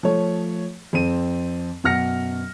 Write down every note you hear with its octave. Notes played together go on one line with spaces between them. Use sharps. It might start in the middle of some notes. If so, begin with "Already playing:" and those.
F3 A3 C#5
F2 C4 D#7
F#2 B2 F#5 F6 A#6 C#7